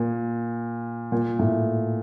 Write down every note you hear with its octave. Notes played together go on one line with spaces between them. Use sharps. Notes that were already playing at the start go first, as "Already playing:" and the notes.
Already playing: A#2
A#2
A2